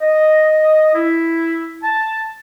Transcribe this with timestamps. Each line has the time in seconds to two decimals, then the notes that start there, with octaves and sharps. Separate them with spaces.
0.01 D#5
0.95 E4
1.83 A5